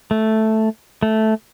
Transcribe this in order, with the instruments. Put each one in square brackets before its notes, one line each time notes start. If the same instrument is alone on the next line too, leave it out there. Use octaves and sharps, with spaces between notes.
[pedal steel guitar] A3
A3